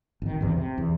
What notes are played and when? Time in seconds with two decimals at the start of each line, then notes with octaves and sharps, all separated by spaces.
0.22 G#1 D#3
0.41 G#1 E2 C3
0.58 C3
0.78 E2